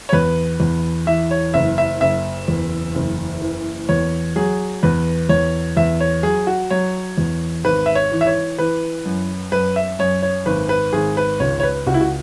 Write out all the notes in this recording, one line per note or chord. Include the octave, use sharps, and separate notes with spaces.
C#5
E2 B4
E2
E3 E5
C#5
F#1 E5
E5
F#1 E5
E2
F#1
E3
E2 C#5
F#3 G#4
E2 B4
E2 C#5
E2 E5
C#5
F#3 G#4
F#4
F#3 C#5
E2
G#1 B4
E5
C#5
E3
E5
C#5
E3 B4
F#2
F#2 B4
E5
F#2 C#5
C#5
G#1 B4
B4
G#1 G#4
B4
C#2 C#5
C#5
B4
C#2 F#4
E4
F#4